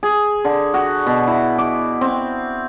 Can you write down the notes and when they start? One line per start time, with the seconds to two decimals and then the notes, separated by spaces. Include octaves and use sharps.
0.03 G#4
0.45 D3
0.74 F#4
1.06 B2
1.27 E4
1.58 D6
2.01 C4